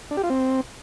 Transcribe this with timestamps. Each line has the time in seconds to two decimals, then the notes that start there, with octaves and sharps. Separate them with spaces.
0.11 D4
0.17 G4
0.23 F4
0.30 C4